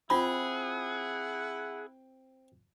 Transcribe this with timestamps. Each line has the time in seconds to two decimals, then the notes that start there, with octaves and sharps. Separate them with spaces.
0.10 C4 E4 F4 G#4 F#5 B5